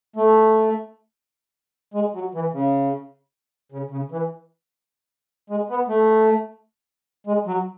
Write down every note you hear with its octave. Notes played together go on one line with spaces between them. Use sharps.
A3
G#3
F#3
E3
C#3
C#3
C#3
E3
G#3
B3
A3
G#3
F#3